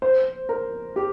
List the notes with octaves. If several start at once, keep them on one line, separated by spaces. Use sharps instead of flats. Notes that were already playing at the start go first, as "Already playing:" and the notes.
C5
A#4
G4